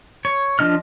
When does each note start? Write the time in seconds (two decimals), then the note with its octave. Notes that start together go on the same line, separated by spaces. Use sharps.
0.25 C#5
0.59 F3 D4 D#5 F6